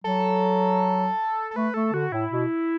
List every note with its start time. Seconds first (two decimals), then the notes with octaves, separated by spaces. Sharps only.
0.04 F#3 A4
1.51 A4
1.56 A3 B4
1.74 A3 A4
1.93 D3 F#4
2.12 A2 E4
2.32 B2